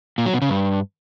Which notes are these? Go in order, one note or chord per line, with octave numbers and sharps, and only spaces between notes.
A#2
F#3
B2
C#3
G2